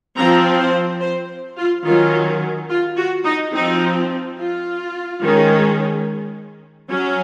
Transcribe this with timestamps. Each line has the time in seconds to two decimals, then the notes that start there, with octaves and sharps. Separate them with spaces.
0.16 F3 C4 A#5
0.58 C5
1.00 C5
1.57 F4
1.85 D#3 F#3 C#4 F4
2.69 F4
2.97 F#4
3.24 D#4
3.53 F3 C4 D#4
4.37 F4
5.21 D#3 G#3 C#4
6.90 F#3 C#4